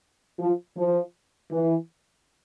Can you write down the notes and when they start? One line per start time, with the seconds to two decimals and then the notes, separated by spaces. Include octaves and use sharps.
0.39 F3
0.77 F3
1.51 E3